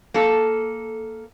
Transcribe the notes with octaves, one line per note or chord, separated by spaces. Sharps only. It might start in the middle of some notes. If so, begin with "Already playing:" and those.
A#3 A4